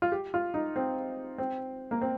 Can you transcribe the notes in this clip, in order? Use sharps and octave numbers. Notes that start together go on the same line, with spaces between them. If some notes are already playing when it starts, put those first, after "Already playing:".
F4
G4
F4
D#4
C4
C4
A#3
C4